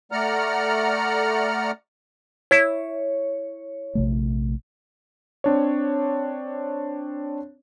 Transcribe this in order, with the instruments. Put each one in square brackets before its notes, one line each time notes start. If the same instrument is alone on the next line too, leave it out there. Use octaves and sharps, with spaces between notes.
[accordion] A3 D5 F#5 A#5 F6
[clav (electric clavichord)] E4 [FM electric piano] C#5
[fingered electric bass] A#1 C3 A3
[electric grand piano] C4 D4 C#5